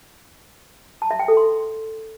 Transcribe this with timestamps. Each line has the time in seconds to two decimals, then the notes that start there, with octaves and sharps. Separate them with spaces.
1.02 A5
1.11 E5
1.19 G5
1.28 A4
1.37 C6